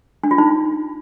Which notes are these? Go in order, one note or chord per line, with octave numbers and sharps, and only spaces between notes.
D4
F4
D#4